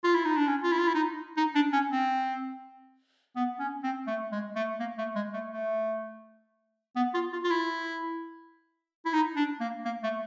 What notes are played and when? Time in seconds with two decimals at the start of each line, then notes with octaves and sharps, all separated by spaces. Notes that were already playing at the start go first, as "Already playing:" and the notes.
0.04 F4
0.15 E4
0.25 D#4
0.36 D4
0.48 C#4
0.63 F4
0.72 E4
0.79 F4
0.88 E4
0.95 D#4
1.37 D#4
1.55 D4
1.73 C#4
1.92 C4
3.36 B3
3.59 C#4
3.84 C4
4.07 A3
4.32 G#3
4.56 A3
4.80 A#3
4.98 A3
5.16 G#3
5.34 A3
5.52 A3
6.96 B3
7.14 F4
7.33 F4
7.44 F4
7.51 E4
9.05 E4
9.13 D#4
9.36 D4
9.60 A#3
9.85 A#3
10.03 A3